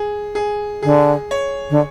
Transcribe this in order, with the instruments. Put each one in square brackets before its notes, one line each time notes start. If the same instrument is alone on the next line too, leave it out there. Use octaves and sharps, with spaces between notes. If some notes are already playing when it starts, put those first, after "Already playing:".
Already playing: [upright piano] G#4
G#4
[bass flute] D3 [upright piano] G#4
[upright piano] C#5
[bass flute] D3